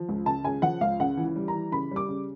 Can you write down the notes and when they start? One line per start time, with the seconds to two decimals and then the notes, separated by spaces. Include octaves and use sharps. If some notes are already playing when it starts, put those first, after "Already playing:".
Already playing: F3
0.09 C#2
0.26 C#3 A5
0.44 C#3 G#5
0.62 F3 F#5
0.81 C#2 F5
1.00 C#3 F#5
1.17 E3
1.36 G3
1.48 A#5
1.54 E3
1.72 C#3 B5
1.91 G3 D6
2.08 C#3